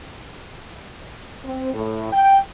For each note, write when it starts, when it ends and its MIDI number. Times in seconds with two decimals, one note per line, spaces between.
1.45 1.73 60
1.74 2.11 45
2.13 2.39 79